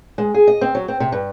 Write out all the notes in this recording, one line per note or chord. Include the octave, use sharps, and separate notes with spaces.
G#3
G#4
D#5
C4
F#3
C4
C3
G2